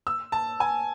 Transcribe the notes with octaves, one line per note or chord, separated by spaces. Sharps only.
E6
A5
G#5